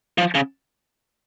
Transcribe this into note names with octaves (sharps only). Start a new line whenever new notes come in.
F3
C#3